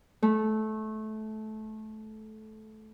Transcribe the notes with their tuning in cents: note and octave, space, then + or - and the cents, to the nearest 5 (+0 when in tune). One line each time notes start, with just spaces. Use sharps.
A3 -20